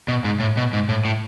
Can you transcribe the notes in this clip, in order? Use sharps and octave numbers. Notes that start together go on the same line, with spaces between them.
B2
G#2
A2
B2
G#2
A2
A2